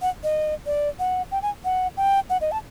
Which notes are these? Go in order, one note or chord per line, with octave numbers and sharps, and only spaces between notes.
F#5
D#5
D5
F#5
G5
G#5
F#5
G5
F#5
D#5
A5